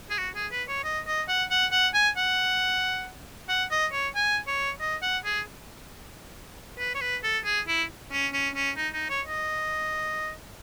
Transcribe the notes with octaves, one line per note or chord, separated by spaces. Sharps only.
G#4
F#4
G#4
B4
C#5
D#5
D#5
F#5
F#5
F#5
G#5
F#5
F#5
D#5
C#5
G#5
C#5
D#5
F#5
G#4
B4
C#5
B4
A4
G#4
E4
C#4
C#4
C#4
D#4
D#4
C#5
D#5